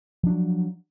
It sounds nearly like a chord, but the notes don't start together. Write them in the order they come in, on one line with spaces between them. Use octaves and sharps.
F3 D4 F#3